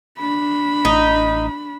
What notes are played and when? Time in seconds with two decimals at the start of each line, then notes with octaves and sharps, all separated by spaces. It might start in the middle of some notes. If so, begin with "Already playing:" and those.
0.19 D4 B5
0.85 A1 D#4